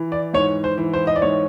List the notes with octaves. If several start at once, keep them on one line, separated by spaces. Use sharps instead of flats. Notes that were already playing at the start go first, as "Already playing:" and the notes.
Already playing: E3
D5
G#2 C#5
C5
E3
C5
D#5
D5
G#2 C#5